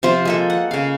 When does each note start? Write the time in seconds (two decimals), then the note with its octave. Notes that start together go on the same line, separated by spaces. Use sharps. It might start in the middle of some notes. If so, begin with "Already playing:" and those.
0.03 C3 F3 F4 C5
0.25 G#3 A#3 A4
0.50 F#5
0.71 C#3 F5